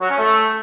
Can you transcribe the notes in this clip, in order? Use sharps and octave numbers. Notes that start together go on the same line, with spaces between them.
F#3
C#4
A3